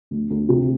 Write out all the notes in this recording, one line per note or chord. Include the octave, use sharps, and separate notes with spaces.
D2
D2
C3